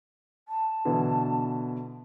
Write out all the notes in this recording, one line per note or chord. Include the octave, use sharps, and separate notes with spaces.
A5
B2 D3 E3